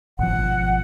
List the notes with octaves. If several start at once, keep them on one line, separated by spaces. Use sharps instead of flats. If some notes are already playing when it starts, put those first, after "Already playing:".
G#1 B2 F3 F#5